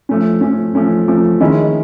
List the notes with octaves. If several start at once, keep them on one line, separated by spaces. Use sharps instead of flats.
F3 A3 C#4
F3 A3 C#4
F3 A3 C#4
F3 A3 C#4
D#3 G#3 C#4 E4